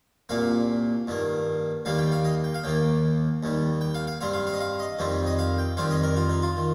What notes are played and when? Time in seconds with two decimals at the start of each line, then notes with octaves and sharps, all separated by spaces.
0.29 C2 A#2 A#3 F5
1.08 G2 D#3 A#3
1.85 D#2 D#3 G3 A#3 F5
1.98 G5
2.12 F5
2.25 D#5
2.44 G5
2.54 F5
2.64 D#2 D#3 A#3 G5
3.43 D#2 D#3 G3
3.81 G5
3.94 F5
4.07 F5
4.21 G2 G3 C4 F5
4.33 F5
4.47 F5
4.54 D#5
4.60 F5
4.79 D#5
4.99 F2 D#3 G3 C4
5.26 D#5
5.39 F5
5.58 G5
5.77 F2 D#3 G3 C4 F5
5.91 D#5
6.04 A#4
6.16 F4
6.29 D#4
6.42 F4
6.57 D#3